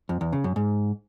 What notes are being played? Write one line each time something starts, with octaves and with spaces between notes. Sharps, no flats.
F2
E2
C#3
F#2
G#2